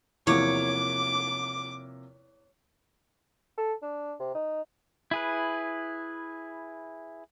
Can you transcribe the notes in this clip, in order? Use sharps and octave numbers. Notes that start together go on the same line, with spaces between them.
E2 C3 F3 A#3 C#5 D6
A4
D4
C3
D#4
E4 G#4 B4